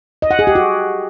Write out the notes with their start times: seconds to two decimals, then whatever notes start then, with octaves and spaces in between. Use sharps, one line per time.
0.22 D#5
0.31 F#5
0.39 G#4
0.47 G4
0.55 F#4